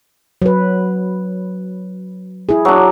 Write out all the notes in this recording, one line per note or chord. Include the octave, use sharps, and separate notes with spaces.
F#3 B4
E4 G#4
F#3 D4